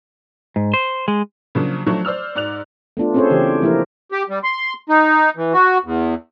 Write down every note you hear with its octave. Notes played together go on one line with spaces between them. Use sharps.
G#2
C5
G#3
C#3 F3 F#3 A#3 D4
F3 F#3 A3 D4
C5 D5 E6 F6
G#2 D5 F#6 F7
A3 B3 D4 F4
C4 C#4 G#4 A4 C5 C#5
C#3 E3 G4
F3 A#3 E4 G4 A#4
G4
G3
C6
D#4
E3
F#4
E2